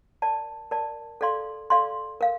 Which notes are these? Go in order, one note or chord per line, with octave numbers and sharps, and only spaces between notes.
A#4 D5 A5
A#4 D5 A5
A4 D5 F5 C6
A4 D5 F5 C6
A#4 F5